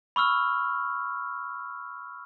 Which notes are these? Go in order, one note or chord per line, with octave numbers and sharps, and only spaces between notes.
B5 C#6 E6 F6